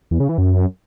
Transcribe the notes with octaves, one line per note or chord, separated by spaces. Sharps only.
E2
C#3
E3
F#2